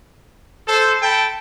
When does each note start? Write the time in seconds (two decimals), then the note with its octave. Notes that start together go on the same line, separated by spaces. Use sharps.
0.67 A4 C5
1.02 A4 G5 A5 B5